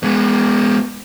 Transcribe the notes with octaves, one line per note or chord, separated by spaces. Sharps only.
G#3 B3